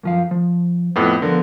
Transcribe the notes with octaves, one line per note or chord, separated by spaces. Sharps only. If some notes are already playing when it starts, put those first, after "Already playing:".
F#2 F3 F5
F3
F2 A2 B3
D3 F3 B3 A#4